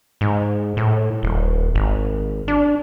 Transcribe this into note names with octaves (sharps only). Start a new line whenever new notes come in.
G#2
A2
D#1
G#1
D4